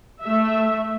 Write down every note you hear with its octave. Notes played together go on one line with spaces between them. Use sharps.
A3 E5